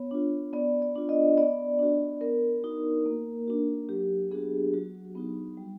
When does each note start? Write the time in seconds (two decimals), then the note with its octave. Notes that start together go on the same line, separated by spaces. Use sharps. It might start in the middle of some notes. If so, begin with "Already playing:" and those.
Already playing: B3 C#5
0.11 D4 F4
0.53 B3 D5
0.82 D5
0.96 D4 F4
1.09 D#5
1.38 B3 D5
1.79 D4 F#4
2.21 B3 A#4
2.63 D#4 F#4
3.06 A#3
3.48 D4 F#4
3.89 F#3 G4
4.31 B3 D4 F#4 G#4
4.73 F#3 F#4
5.15 B3 D#4 F#4
5.57 G3